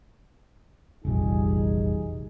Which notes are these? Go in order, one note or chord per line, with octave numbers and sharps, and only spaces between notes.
F1 A#1 E2 G3 D#4 G#4